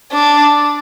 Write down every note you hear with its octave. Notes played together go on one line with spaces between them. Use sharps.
D4